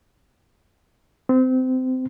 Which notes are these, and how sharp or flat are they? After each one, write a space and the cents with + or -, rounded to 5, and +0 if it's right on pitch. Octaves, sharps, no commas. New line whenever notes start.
C4 -25